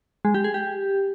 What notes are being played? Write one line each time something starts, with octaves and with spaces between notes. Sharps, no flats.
G#3
G4
G#4
G4